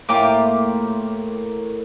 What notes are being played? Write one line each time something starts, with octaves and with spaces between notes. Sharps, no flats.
A2 A#3 F4 G4 D6